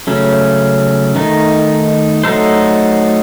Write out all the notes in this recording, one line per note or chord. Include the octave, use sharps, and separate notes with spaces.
C#3 F#3 A3 C#4
D#3 A3 D#4
F#3 A3 D#4 A4 C5